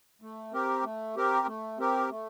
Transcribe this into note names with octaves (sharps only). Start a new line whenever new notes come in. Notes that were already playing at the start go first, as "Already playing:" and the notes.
A3
C4 G4 A#4
A3
C4 G4 A#4
A3
C4 G4 A#4
A3